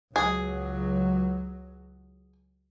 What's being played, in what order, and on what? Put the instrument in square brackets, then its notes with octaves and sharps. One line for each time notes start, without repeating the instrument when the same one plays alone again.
[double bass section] C#2 F#3 [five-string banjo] G#4